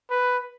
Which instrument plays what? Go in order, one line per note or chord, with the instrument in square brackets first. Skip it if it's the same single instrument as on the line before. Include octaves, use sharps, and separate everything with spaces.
[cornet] B4